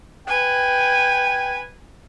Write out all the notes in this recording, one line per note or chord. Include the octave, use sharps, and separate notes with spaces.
B4 G5 G#5